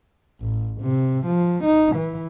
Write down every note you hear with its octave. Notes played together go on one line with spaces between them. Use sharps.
A1
C3
F3
D#4
E3